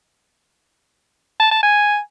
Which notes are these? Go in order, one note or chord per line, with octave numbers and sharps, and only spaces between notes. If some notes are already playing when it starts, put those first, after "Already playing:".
A5
A5
G#5